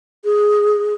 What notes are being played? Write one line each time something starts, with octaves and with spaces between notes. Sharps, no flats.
G#4